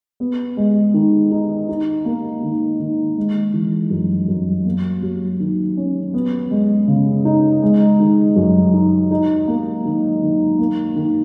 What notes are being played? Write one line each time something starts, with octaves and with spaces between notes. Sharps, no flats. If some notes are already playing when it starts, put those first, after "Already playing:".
B3
G#3
D#3
D#4
D#4
A#3
D#3
D#3
G#3
E3
F#2
F#2
A#3
F#3
D#3
C#4
B3
G#3
C#3
D#4
G#3
D#3
F#2
D#4
D#4
A#3
D#3
D#3
A#3
D#3